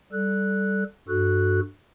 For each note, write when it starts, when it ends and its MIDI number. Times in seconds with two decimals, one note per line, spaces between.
0.13 0.84 55
0.13 0.84 69
0.13 0.84 90
1.08 1.60 43
1.08 1.60 66
1.08 1.60 69
1.08 1.60 90